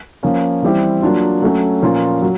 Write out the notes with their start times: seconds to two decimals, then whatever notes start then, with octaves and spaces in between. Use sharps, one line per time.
0.23 F3 A#3 C#4
0.62 E3 G3 C4 E4 G4
1.02 F#3 A#3 D4 F4
1.42 F#3 A3 C#4 F#4
1.82 A#2 F3 A#3 C#4 F4
2.22 F#3